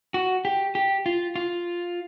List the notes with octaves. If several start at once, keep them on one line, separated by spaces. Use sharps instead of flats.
F#4
G4
G4
F4
F4